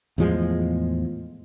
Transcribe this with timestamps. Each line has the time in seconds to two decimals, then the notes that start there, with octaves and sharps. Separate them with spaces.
0.18 E2 A2 F3 G#3